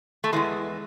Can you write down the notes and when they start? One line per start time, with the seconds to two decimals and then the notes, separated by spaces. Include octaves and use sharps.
0.24 A3
0.33 E2 C#3 E3 G#3